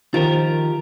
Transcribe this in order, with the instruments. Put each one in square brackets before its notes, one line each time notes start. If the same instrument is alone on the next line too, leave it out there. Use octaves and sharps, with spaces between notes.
[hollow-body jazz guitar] D#3 F3 [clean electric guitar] F4 G4 A#4